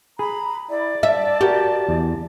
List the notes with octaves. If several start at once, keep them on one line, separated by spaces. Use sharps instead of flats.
G#4 A#5 B5
E4 D5
E5 A5
F#4 G4 A#4
E2